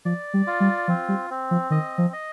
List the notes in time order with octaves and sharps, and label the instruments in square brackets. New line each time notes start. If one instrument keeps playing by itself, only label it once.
[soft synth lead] F3 [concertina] D5
[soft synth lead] G3
[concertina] F4
[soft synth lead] G3
[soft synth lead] F3 [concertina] C4
[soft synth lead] G3
[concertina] C4
[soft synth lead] F3
[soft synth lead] D#3 [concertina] D#5
[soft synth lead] F3
[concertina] D#5